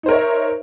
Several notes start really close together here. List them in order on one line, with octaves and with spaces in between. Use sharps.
D#4 C5 A#4 C#5 E5